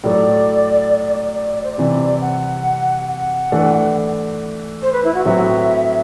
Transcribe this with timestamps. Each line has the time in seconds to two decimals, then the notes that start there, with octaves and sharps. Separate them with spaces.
0.04 A2 F#3 A3 D5
1.34 D5
1.56 D5
1.64 C5
1.72 D5
1.78 C3 E3 G3 C4
2.21 F#5
3.09 F#5
3.52 E3 A3 D4
4.82 C5
4.93 B4
5.04 E4
5.14 F#4
5.25 A2 F#3 C4 F#4 B4 E5